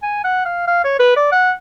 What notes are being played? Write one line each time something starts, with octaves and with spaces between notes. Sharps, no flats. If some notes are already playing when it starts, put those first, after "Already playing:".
G#5
F#5
F5
F5
C#5
B4
D5
F#5